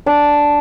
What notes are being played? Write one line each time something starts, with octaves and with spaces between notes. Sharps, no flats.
D4